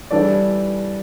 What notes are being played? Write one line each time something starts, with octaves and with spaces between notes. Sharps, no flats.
E3 G3 D4 A4 D5